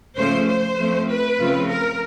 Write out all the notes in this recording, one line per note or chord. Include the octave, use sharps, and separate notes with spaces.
C#3 F3 A3 C#4 C5
C5
F3 A3 C4
B4
C#3 F3 A3 C4 F4
A#4